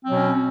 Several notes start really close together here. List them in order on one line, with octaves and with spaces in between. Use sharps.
C4 F#3 B2 C#4